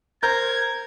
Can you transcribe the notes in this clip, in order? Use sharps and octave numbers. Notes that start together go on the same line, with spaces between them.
A#4 C5 G6 G#6